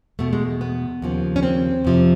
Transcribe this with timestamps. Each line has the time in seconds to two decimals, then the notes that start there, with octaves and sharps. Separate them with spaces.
0.19 E2 B2 A3
0.33 G#3
0.61 B3
1.02 D#2 C#3 F3
1.36 C#4
1.43 C4
1.85 F2 C3 F3